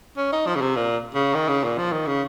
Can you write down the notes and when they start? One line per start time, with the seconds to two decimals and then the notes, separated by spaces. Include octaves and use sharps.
0.17 C#4
0.32 D#4
0.46 F3
0.55 C#3
0.61 C3
0.76 A#2
1.14 C#3
1.35 D#3
1.49 C#3
1.64 A#2
1.78 F3
1.92 D#3
2.07 C#3